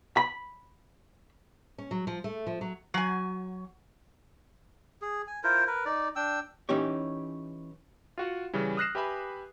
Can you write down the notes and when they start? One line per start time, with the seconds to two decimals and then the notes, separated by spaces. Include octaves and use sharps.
0.17 B5
1.78 C#4
1.91 F#3
2.07 F3
2.24 A3
2.47 F3
2.61 F#3
2.94 F#3 G#5
5.02 G#4
5.27 G#5
5.44 E4 F4 A#4 C5
5.67 A#4 B4
5.86 D#4 D5
6.16 D4 G5 E6
6.69 E3 C#4 D#4 G4 C#5
8.18 F4 F#4 F#5
8.53 C#3 E3 G3 C#4
8.77 D#6 F6 F#6 A#6 C7 E7
8.95 G4 B4 E5 G#5 B5